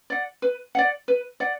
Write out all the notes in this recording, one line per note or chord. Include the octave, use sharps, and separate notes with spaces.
D5 F#5
B4
D5 F#5
B4
D5 F#5